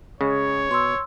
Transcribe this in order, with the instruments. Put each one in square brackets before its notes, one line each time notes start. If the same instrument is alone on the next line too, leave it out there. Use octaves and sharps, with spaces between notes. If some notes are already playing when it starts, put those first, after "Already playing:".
[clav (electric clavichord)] C#3 G#3 [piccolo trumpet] C#5
[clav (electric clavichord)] B2 [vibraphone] C6 E6